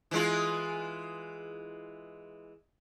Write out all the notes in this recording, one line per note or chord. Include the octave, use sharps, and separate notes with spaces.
E3 G#3 F4